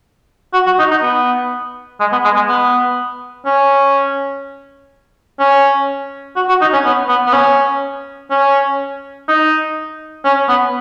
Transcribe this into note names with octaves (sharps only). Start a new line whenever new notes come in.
F#4
F#4
D#4
D#4
B3
G#3
B3
G#3
G#3
B3
C#4
C#4
F#4
F#4
D#4
C#4
B3
B3
B3
C#4
C#4
D#4
C#4
B3